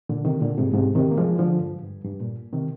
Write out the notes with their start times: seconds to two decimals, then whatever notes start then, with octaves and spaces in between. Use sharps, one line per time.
0.09 A#2 D3
0.25 C3 D#3
0.42 A#2 D3
0.58 G#2 C3
0.73 G#2 C3
0.95 C3 D#3
1.11 A#3
1.18 F3 G#3
1.39 D3 F3
1.60 G2
1.82 G2
2.04 G2
2.20 A#2
2.53 C3 D#3